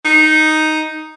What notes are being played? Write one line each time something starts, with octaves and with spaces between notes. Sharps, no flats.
D#4